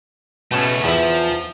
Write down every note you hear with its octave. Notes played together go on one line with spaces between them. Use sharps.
C#2 B2 A3 C#4
E2 F3 E5